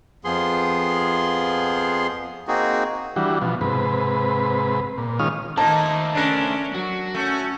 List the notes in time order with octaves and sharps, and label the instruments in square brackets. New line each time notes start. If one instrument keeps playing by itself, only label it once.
[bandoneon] F2 F3 B3 G#4 C6
A#3 C4 D#4 F#4 G#4
[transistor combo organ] E3 G3 D4 F#4
B2 F3
G#2 C3 B4
A#2
D#3 G#3 C#4 F4 D#6 F6
[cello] D#3 D#4 [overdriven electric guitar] A3 C5 [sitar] A#3 [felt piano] A5
[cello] C#4 [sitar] D4 A#4
[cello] F#3 [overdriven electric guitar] F#4
[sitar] A3 [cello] C#4